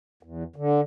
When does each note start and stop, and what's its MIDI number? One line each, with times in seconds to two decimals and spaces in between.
0.23 0.43 40
0.56 0.81 50